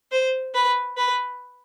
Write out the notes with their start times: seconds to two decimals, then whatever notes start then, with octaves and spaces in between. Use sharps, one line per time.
0.12 C5
0.55 B4
0.97 B4